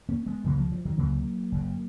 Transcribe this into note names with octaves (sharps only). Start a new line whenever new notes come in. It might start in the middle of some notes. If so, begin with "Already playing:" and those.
A#3 C#4
G#3 B3
C#2 C#3 F#3 A#3
F3 G#3
F3
D#3 F#3
C#2 C#3 F#3 A#3
F#1 F#2 C#3